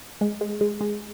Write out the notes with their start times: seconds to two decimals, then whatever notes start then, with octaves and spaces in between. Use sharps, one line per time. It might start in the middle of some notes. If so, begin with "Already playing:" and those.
0.21 G#3
0.41 G#3
0.61 G#3
0.81 G#3